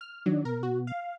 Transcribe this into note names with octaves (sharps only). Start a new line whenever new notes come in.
F6
D#3 F#3 D4
B2 A#4
F#4
F5